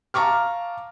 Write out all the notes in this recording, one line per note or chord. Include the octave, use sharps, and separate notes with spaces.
F5 A5 A#5 C#6 D6 F6